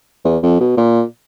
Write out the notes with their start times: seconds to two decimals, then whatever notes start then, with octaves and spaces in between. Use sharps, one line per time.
0.25 E2
0.43 F2
0.60 B2
0.77 A#2